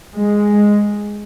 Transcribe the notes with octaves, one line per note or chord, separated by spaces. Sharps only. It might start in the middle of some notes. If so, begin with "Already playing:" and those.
G#3